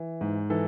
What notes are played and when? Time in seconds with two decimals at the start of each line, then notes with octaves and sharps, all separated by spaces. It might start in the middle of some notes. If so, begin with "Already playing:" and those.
Already playing: E3
0.21 G#2
0.50 E3 A4